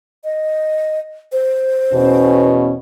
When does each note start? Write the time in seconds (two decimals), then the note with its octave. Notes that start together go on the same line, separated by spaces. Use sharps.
0.24 D#5
1.32 C5
1.92 E2 B2 C#4